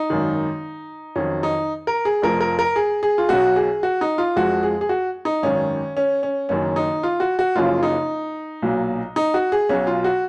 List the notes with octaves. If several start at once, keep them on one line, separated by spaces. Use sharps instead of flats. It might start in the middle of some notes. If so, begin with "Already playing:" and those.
Already playing: D#4
G#1 F#2 D#3
F2 D#3 F#3 C#4
D#4
A#4
G#4
F1 F2 F3 A#4
A#4
A#4
G#4
G#4
F4
B1 B2 F#3 F#4
G#4
F#4
D#4
F4
F2 F3 G#3 F#4
G#4
G#4
F#4
D#4
G#1 F#2 D#3 C#4
C#4
C#4
F#1 F#2 D#3 C#4
D#4
F4
F#4
F#4
F#1 F#2 C#3 F3 F4
D#4
B1 A#2 F#3
D#4
F#4
G#4
B1 B2 F#3 C#4
F4
F#4